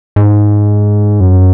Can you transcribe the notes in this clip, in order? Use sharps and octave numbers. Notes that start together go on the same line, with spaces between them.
G#2
F#2